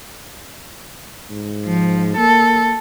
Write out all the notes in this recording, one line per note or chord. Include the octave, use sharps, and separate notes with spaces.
G#2
F3
A#3 A4